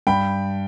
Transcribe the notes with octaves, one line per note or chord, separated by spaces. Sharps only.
G2 G5 B5